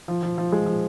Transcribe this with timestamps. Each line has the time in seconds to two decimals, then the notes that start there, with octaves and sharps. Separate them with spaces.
0.08 F3
0.23 F3
0.38 F3
0.52 G#3
0.66 F3